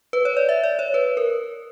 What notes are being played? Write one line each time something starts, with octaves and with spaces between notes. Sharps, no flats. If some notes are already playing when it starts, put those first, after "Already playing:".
B4
C#5
D5
E5
D5
C#5
B4
A#4